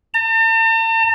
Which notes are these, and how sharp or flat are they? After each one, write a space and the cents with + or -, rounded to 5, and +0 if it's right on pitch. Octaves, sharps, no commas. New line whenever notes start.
A5 +45